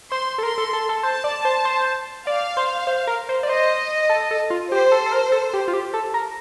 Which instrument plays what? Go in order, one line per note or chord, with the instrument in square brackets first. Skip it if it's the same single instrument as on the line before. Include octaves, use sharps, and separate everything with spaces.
[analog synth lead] C5 [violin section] C6
[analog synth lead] A4
[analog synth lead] A#4 [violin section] C6
[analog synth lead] A4
A4
A4
[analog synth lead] C5 [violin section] A5
[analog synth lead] D5
C5
C5
[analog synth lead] D5 [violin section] F5
[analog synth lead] C5
C5
A#4
C5
D5
[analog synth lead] C5 [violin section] D#5
[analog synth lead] A4
A4
F4
[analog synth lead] G4 [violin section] C5
[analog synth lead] A4
A4
A#4
A4
G4
F4
G4
A4
A#4